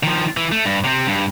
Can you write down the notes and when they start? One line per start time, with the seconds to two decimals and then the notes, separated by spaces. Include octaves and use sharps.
0.03 D#3 F3
0.37 E3
0.52 A3
0.65 G2
0.84 C3 C4
1.07 G2